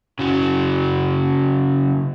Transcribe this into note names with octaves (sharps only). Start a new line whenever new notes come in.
C#3 F#3